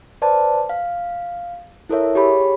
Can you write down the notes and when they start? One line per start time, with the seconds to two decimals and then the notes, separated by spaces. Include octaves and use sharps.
0.22 B4 C5 D5 A5
0.69 F5
1.89 E4 A4 A#4 C#5 E5
2.15 G4 G#4 C#5 B5